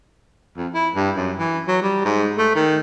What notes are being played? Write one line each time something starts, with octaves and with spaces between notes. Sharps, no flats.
F2
E4
G2
F#2
E3
F#3
G3
G#2
A3
D#3